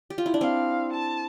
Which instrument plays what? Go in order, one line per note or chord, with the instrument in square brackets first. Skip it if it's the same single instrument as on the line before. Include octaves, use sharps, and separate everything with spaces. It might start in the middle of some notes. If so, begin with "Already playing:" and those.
[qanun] G4
F4
E4
D4
[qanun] C4 [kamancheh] F5
[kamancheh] A5